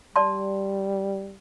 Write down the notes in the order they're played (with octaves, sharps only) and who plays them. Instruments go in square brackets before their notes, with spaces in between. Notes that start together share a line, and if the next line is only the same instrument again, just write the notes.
[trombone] G3 [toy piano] D5 A5 C6